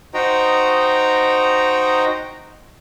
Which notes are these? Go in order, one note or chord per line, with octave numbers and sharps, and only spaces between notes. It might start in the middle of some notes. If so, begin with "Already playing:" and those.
D#4 F#4 C5 D#5 G5 A#5